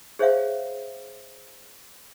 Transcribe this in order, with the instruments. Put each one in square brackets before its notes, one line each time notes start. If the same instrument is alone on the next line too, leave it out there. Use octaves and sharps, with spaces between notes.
[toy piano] G#4 C5 C#5 E5 F5